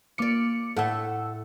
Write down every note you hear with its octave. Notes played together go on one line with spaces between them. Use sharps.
A#3 F4 D5 D6 C#7
A2 A3 A4 F#5 E6